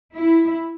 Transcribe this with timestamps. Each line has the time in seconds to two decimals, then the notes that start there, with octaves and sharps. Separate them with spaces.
0.14 E4